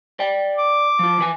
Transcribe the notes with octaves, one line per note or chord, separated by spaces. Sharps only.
D5 G5
D6
F3 F4
E3 B4 G#5